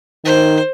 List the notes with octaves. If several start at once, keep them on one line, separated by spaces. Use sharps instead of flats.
D#3 C5